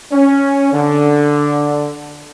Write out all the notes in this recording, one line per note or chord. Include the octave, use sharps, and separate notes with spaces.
C#4
D3